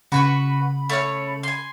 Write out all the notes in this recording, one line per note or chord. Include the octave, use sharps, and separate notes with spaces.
C#3 F#4 B4 B5 C#6
A3 C#5 F6
G#5 C6